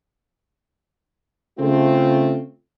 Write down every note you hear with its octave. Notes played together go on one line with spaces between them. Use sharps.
C#3 A3 C4 F4